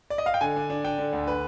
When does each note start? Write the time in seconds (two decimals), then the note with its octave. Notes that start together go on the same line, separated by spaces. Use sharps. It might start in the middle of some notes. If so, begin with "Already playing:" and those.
0.10 D5
0.18 D#5
0.26 F5
0.34 G5
0.41 D3 G#5
0.56 D4
0.70 D4
0.84 D4 G5
0.98 D3
1.13 D2
1.27 B4